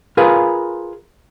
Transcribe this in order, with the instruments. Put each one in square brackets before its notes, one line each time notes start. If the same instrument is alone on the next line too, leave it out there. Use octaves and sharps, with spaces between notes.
[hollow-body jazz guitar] F4 G#4 A#4 B4 F5 G#5